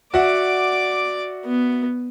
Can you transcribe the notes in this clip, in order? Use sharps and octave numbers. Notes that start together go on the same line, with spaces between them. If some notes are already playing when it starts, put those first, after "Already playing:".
F#4 D5 E5 F#5 D6
B3